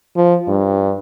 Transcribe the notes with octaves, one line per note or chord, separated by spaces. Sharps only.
F3
G2